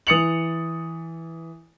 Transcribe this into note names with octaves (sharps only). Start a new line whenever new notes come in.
E3 D#6 A6 C#7 F7 F#7